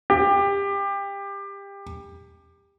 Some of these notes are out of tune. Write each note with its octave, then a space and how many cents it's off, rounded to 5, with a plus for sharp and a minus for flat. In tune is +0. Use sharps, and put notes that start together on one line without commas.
G4 +25